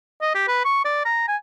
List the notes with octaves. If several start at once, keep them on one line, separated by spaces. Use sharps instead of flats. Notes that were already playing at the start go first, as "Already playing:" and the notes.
D#5
G4
B4
C#6
D5
A#5
G#5